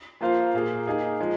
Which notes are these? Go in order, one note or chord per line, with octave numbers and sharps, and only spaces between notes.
F3 A#3 F4 C5 F5
A#2 A#3 G#4 F5
A#3 D#4 G#4 F5
F3 G#3